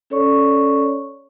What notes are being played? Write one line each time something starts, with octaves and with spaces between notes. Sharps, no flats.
C#4 A4 C#5 D5 C#6